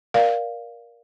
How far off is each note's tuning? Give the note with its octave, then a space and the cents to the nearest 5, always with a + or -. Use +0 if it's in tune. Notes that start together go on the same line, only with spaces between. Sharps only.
A#4 +15 D5 +0 F5 +0